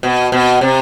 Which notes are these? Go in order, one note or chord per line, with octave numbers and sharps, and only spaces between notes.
B2
B2
C3